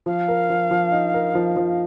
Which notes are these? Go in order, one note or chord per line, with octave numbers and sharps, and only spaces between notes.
F3 F5
A#4
F3
F3
D#4
A#4
F3
F3